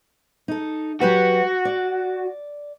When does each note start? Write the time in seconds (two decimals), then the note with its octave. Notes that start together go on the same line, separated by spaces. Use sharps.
0.48 D#4 A4
1.01 F#3 F#4 G4 B4
1.65 D5